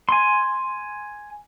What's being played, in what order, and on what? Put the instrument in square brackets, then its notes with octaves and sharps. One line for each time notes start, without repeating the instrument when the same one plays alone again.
[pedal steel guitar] G#5 C6